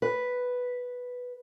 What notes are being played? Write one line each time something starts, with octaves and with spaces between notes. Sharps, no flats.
B4